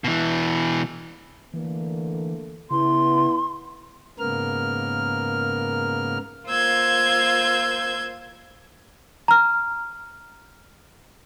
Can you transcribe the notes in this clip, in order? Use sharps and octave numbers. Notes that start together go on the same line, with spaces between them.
B2 E3
D3 E3 A3 A#3
C#3 B3 E4 C6
G#2 C#3 A#3 B3 A#4 F6
A#3 F4 C5 E6 G6 G#6
A#5 F6